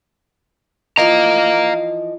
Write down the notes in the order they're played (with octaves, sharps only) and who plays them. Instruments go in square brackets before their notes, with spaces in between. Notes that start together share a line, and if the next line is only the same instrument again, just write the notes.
[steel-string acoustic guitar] E3 F3 D#5 [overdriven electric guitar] F5 A#5